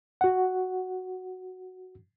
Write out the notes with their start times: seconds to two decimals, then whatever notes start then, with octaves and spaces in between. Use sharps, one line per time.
0.21 F#4 F#5